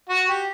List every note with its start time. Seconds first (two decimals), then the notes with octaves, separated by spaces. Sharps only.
0.09 F#4
0.29 G4